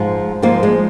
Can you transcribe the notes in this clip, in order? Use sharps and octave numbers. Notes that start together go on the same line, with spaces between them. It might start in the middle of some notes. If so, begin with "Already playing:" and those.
Already playing: G#2 F3 G#3
G#2 F3 G#3 A#3
G#3